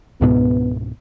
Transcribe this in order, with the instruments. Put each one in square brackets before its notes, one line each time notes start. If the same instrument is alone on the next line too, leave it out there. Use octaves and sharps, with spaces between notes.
[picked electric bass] C#2 G#2 B2 [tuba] B3